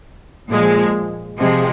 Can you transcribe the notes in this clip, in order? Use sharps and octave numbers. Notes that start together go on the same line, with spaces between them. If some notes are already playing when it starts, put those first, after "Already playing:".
A#2 F3 G#3
C3 F3 G#3